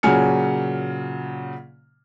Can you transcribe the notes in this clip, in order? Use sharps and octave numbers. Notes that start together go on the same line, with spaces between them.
A#2 C#3 F#3 G#5 F6 C#7